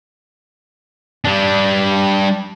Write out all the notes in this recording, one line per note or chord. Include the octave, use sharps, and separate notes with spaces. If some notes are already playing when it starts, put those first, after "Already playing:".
G3 D4